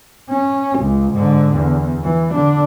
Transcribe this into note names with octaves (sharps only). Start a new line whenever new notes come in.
C#4
C#2
G#2 D3
E2
E3
D3 D4